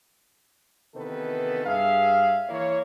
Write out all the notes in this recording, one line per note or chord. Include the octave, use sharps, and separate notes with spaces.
C3 D#3 E3 B3 A4 B4
G2 G#4 E5 F5
E3 A#3 E4 C#5